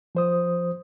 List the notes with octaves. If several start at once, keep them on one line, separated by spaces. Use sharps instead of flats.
F3 C5 D#6